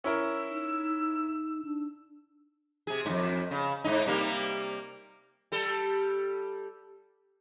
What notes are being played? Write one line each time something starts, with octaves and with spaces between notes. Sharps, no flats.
C#4 E4 A#4 E6
D#4
D4
C3 G#4
F2 G#2
C#3
G#2 D#4
C3 G3 A#3
G3 A4